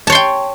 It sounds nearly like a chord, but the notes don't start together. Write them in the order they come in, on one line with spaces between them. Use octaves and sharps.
A5 C#5 C6 G5